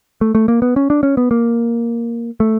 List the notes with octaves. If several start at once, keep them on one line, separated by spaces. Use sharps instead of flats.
A3
A3
A#3
B3
C#4
D4
C#4
B3
A#3
A3